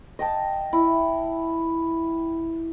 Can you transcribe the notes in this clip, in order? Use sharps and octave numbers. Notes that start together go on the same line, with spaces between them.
D#5 G5 A5
E4